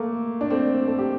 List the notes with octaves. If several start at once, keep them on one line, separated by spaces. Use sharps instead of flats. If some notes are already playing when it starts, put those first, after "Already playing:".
Already playing: A3 A#3
D4
A3 C4
A4
G4